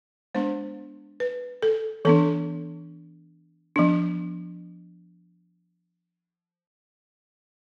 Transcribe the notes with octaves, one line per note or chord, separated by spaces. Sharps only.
G#3 B3 D4 C5
B4
A4
E3 B3 D4 A4
F3 B3 D4